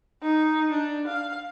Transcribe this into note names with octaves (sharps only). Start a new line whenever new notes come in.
D#4
D4
F5